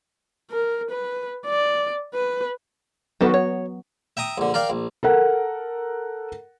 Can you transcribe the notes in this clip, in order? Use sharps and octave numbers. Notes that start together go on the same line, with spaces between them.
A#4
B4
D5
B4
D#3 F#3 B3 F#4 A4 B4
C#5
E5 G5 A#5 D#6
A#1 D3
A#4 D5 F5 G5
A#1
A4 A#4 F#5